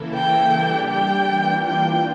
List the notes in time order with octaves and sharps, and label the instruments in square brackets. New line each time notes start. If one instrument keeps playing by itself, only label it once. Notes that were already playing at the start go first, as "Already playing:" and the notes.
Already playing: [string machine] C#3 E3 A#3 E4 A4
[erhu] G5
[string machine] G3 D4 G4 D5
[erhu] G5
[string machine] E3 A#3 D4 F4
[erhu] G5